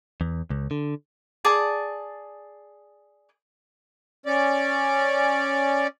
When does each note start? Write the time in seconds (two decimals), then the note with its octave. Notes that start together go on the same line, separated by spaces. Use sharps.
0.21 E2
0.50 C#2
0.71 D3
1.45 G#4 D5 A5
4.26 C#4 D5